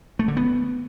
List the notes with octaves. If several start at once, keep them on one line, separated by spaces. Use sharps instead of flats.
A3
D3
B3